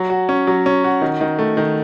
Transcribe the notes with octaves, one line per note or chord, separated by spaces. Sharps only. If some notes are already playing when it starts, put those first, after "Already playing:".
Already playing: F#3
F#4
C#4
F#3
C#4
F#4
D#3
D#3
A3
D#3